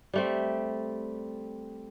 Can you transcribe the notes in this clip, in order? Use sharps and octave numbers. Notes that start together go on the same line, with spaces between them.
G3 A3 C4